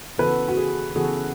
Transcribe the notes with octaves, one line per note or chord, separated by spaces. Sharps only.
C#3 E3 B3 F#4 A4 B4
F#4
G#4
C#3 E3 B3 F#4 G#4 A4